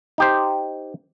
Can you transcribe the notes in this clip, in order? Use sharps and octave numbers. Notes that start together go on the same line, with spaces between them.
D#4 G4 C5